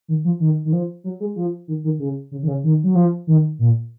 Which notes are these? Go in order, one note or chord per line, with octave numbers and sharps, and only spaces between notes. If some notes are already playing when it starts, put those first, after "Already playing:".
D#3
F3
D#3
D#3
F3
F#3
G#3
F3
D#3
D#3
C#3
C#3
D#3
C#3
D#3
F#3
F3
D#3
A#2